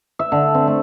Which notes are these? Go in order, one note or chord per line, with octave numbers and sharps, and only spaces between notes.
E5
D3
C4
A3